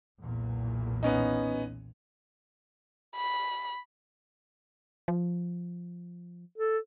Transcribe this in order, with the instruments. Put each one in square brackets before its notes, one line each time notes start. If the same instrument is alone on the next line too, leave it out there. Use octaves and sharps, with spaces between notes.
[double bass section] B1 E2 A#2
[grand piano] B3 C#4 D#4
[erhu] B5
[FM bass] F3
[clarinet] A4